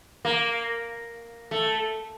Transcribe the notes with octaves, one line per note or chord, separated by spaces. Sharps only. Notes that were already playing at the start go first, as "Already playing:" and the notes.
A#3
A3